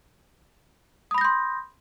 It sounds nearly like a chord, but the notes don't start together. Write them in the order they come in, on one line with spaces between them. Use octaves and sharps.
D#6 B5 A#6 G6 C6